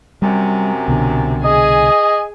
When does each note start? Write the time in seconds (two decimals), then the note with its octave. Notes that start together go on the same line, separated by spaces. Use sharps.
0.22 F#2 C3 G3
0.88 C2 B2 D3
1.44 G#4 D#5 G#5